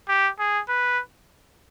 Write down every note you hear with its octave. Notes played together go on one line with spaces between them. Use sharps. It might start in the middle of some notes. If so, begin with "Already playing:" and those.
G4
G#4
B4